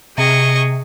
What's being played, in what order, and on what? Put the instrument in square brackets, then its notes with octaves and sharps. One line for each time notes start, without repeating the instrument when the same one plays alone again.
[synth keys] C3 [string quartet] G#4 D#5 C#6